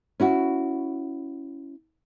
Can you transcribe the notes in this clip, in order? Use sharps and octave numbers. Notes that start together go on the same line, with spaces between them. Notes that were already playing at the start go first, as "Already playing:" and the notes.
C#4 E4 F#4